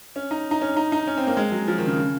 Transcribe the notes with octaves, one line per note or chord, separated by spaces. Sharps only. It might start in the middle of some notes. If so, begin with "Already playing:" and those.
C#4
D#4
D#4
C#4
D#4
D#4
C#4
C4
A#3
G#3
F#3
F3
D#3
C#3
C#3